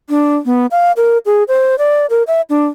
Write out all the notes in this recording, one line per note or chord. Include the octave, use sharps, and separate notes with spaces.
D4
B3
F5
A#4
G#4
C5
D5
A#4
E5
D4